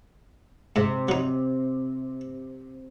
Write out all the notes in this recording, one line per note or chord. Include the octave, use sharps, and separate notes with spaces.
G#2 C3
F#3 D#4